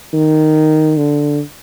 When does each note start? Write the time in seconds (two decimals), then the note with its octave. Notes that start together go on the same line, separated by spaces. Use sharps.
0.13 D#3
0.97 D3